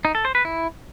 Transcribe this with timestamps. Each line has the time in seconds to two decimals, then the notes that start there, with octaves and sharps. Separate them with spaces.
0.05 D#4
0.15 A4
0.25 C5
0.35 B4
0.45 E4